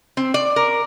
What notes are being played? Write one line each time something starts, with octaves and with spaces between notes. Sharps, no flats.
C4
D5
A#4